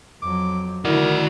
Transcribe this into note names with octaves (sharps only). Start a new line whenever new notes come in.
F2 F#3 D6
D3 D#3 E4 F#4 A#4 D5